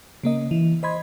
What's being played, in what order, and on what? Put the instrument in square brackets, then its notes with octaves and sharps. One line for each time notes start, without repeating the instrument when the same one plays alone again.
[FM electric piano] C#3 A#3 D#5
E3
C5 D#5 B5 C6 G#6